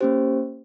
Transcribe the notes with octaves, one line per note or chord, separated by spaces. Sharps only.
A#3 C#4 G4 C5